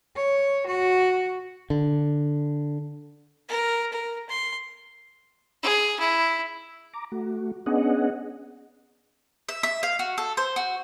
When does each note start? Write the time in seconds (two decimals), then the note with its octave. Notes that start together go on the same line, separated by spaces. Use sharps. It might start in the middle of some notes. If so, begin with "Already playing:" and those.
0.16 C#5
0.67 F#4
1.70 D3
3.49 A#4
3.93 A#4
4.29 C6
5.63 G#4
6.00 E4
6.93 A#5 D6
7.12 A3 F#4
7.66 B3 C#4 D4 G#4 D#5 F#5
9.49 E5
9.63 E5
9.83 F5
9.99 F#4
10.18 A4
10.37 C5
10.56 F#4